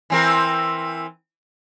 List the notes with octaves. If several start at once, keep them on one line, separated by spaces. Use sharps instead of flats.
E3 C4 A#4